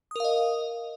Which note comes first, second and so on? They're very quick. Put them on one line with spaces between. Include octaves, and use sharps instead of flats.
D#6 A#4 F5 D#5